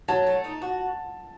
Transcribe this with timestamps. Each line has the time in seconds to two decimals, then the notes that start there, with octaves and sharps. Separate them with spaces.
0.08 F#3 A5
0.26 A3
0.44 D#4
0.62 F#4